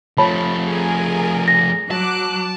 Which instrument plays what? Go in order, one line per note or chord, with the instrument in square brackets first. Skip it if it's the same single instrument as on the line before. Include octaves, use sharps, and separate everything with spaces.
[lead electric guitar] F3 A3 [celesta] C#5 A5 B5
[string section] G#4 A#4 G#5
[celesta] A#6
[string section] F#3 D6 F#6 [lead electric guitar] A5